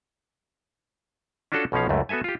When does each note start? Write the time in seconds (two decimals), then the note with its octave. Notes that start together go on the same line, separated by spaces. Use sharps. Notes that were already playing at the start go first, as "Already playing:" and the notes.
1.52 C#4 D4 F4 F#4 A4
1.72 B1 B2 F3 C#4 F5
1.89 C#2 F#2 A3
2.09 B3 F#4 A4 E5 G#5
2.24 F4 G4